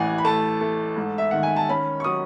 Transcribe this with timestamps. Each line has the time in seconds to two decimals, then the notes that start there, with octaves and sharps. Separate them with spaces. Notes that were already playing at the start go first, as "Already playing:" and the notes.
Already playing: A1 E3 F#5 G#5
0.18 B5
0.25 A3 A5
0.61 A3
0.96 G#2
1.18 E5
1.31 D#3 F#5
1.43 G#5
1.56 A5
1.69 C#4 B5
2.00 C#6
2.04 F#3 D#6